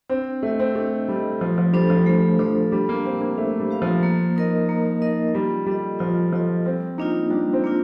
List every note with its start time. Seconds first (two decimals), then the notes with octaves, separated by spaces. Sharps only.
0.10 C4 D4
0.43 A3 A4 D#5
0.59 C4
0.75 A3 D4
1.08 G3 A4 D#5
1.41 F3 A3
1.58 F3
1.73 G3 D4 A4 C5
1.90 F3
2.06 G3 A3
2.39 F3 D4 A4 C5
2.72 G3 D4
2.89 A#3
3.05 C4 G4 C5 F5
3.21 A#3
3.38 A3 D4
3.60 G3
3.71 G4 C5 F5
3.82 F3
4.03 A#3
4.36 D#4 A#4 D#5
4.69 A#3
5.02 D#4 A#4 D#5
5.34 G3 F4
5.66 G3 A4 D#5
5.99 F3 F4
6.32 F3 A4 D#5
6.65 G3 C4
6.98 A#3 D4 D#4 F4
7.30 G3 D4
7.53 C4
7.64 A#3 D4 F4